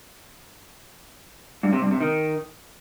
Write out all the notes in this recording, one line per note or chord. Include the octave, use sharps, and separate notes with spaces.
G2
C3
G2
C3
D#3